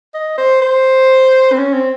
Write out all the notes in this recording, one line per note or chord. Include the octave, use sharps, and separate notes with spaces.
D#5
C5
C5
C4
C#4
C4